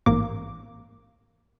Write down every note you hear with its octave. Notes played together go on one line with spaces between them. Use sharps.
A1 G#2 A#3 D6